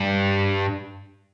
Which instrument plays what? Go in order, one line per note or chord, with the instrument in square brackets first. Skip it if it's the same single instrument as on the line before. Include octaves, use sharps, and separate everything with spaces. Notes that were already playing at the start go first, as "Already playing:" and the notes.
Already playing: [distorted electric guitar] G2